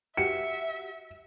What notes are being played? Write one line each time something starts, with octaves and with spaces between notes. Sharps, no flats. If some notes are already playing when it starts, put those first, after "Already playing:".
F#4 G4 E5 F#5 C#7